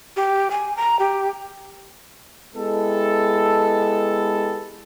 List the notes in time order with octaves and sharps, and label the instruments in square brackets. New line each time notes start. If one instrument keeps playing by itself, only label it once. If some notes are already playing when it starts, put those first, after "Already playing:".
[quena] G4
G#5
A#5
G4
[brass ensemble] G#3 B3 E4 G4 A4